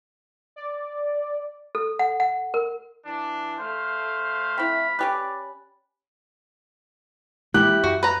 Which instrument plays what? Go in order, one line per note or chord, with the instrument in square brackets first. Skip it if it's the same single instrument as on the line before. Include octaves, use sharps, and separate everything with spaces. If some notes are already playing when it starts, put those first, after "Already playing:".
[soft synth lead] D5
[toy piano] A4
F#5
F#5
A#4
[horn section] E3 D4
[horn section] A3 F5 [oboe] C5
[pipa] C4 E4 [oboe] B5
[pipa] C#4 G4 B4 [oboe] D5
[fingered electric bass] E3 G#3 A#3 [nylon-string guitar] E4 G4 [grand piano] F#6
[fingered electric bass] F#2 [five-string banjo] F#4
[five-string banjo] B4 A#5